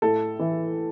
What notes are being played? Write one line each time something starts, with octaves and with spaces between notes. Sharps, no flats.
A2 A4
E3